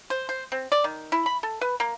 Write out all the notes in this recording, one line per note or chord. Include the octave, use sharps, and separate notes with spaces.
C5
C5
C4
D5
D#3
E4
B5
A4
B4
A#3